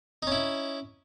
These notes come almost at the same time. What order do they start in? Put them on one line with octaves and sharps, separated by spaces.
D#4 C#4 E4